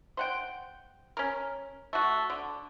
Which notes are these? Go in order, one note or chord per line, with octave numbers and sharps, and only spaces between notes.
C5 F#5 G5
C#4 A#4
A3 F#4
D3